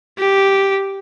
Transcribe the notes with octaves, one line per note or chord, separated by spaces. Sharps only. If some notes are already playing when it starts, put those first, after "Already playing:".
G4